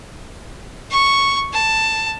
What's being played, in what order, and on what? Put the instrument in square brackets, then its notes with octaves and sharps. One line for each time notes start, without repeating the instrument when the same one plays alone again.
[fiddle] C#6
A5